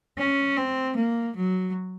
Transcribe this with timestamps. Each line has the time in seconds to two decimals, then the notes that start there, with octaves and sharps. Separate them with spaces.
0.18 C#4
0.57 C4
0.96 A#3
1.36 F#3